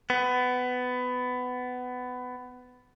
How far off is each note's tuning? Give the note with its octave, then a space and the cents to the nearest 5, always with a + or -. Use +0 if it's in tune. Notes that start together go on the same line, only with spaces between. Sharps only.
B3 +20